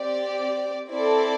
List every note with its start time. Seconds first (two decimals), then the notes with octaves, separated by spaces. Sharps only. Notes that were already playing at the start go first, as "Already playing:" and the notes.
Already playing: C4 G4 D5
0.90 C4 E4 A4 D5